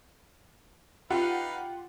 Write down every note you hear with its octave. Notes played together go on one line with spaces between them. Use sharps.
D#4 F4 G4 B4 F5 F#5